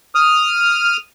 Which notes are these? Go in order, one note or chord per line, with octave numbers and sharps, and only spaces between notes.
D#6 F6